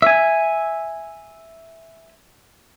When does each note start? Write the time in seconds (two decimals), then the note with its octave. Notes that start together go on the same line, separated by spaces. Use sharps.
0.02 E5 G#5